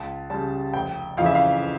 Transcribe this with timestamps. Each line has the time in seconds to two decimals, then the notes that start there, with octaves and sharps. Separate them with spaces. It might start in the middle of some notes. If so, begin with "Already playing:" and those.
Already playing: C#2 A5
0.30 C#3 G3 A5
0.74 F1 G5
1.17 F2 C#3 E3 F5
1.26 E5
1.35 F5